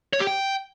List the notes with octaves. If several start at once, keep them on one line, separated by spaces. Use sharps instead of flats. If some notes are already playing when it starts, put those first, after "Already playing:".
C#5
G4
G5